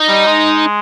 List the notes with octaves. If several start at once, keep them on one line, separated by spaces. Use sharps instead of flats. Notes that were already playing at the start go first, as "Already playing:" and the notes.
Already playing: D#4
G3
G#3